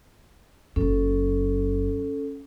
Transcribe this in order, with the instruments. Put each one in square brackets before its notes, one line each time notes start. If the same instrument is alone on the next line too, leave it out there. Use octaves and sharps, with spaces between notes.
[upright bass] F#1 F#2 [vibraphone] C#4 A4